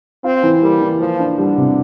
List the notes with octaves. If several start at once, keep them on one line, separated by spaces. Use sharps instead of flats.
C4 F4
E3
G3 A#3
E3
F3 A#3
D4
D3 G3
C3